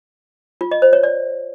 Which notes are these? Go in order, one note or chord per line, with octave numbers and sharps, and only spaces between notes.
F4
D#5
C5
C#5
D5